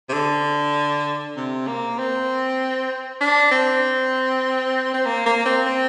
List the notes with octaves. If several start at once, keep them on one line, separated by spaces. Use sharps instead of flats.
C3
D3
C3
A#3
C4
D4
C4
C4
A#3
A#3
C4
C4